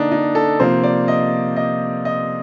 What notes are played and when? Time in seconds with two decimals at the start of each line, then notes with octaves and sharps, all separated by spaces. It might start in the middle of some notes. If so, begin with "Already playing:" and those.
Already playing: D3 A#3 D4 D#4
0.12 D#4
0.35 A4
0.60 C3 F3 A#3 C5
0.83 D5
1.08 D#5
1.56 D#5
2.05 D#5